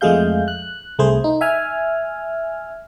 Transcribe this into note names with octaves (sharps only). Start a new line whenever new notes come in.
F2 G#3 A3 G#4 F5 G6
F#6
C2 A3 G#4 C5
D#4
E5 G#5 F6